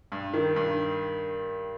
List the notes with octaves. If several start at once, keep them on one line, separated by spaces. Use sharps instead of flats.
G2
D#3
G2